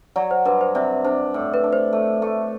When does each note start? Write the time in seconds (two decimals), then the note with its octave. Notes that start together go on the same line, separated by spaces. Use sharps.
0.16 F#3 D5
0.31 C5
0.45 G2 B4
0.61 C5
0.75 C3 D5
1.04 D4 C5
1.34 A2
1.54 B4
1.64 D4
1.73 C5
1.93 A3
2.22 A3